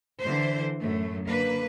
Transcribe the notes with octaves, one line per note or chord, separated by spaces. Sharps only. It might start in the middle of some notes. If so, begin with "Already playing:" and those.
D3 E3 C5
F#2 A2 A3
D3 A#3 B4